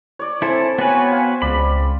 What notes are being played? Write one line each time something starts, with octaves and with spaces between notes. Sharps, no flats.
C#5 D5
C4 E4 A4 G#5
B3 F#4 B4 C#5 G5 G#5
F5
C#2 D5 B5